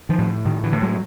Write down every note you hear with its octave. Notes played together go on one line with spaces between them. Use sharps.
D#3 F3
A2
A2 D#3
D3 E3
A2
F#3 G#3